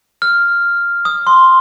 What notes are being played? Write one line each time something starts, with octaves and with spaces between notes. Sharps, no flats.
F6
D#6
C6